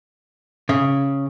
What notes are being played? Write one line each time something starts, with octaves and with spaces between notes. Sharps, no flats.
C#3